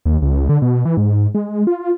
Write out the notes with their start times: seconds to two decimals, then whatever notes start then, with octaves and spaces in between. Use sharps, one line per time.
0.05 D#2
0.22 C#2
0.49 D3
0.62 B2
0.85 E3
0.97 G#2
1.35 G#3
1.67 F4